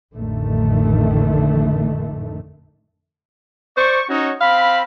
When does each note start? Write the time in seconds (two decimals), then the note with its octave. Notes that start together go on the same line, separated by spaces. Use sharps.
0.15 A1 F2 D3 D#3 A3
3.77 C5 D5 C#6
4.09 C#4 D#4 F#4 C#5
4.41 C4 F5 B5